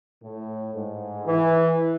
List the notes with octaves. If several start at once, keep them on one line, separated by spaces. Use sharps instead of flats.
A2
G#2
E3